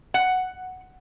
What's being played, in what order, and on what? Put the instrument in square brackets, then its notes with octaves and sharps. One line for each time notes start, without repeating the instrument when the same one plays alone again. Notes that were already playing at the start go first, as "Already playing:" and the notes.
[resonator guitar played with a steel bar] F#5